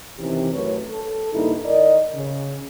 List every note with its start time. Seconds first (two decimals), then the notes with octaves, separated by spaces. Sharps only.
0.19 C3 D#3 E3 C#4 G4
0.53 F#2 A3 B4 C#5
0.90 A4
1.33 G2 C#3 A#3 D#4 E4
1.65 D#3 A#4 D5 D#5
2.15 C#3